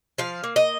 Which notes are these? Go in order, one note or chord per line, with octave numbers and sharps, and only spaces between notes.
F3 F5
A#3
D#5